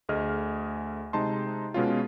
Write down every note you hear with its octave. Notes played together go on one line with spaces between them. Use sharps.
D2 A3 G#4 D#5 F6
C3 G#3 D#4 A5 C6
B2 G#3 C#4 F4